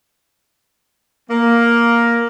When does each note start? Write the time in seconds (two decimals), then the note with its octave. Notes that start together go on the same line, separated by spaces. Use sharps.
1.30 A#3